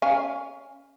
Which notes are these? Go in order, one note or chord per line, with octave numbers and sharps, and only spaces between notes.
C#4 F5 G#5